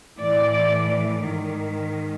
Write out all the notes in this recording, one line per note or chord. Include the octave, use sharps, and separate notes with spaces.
A2 E3 D5
G#2 D#3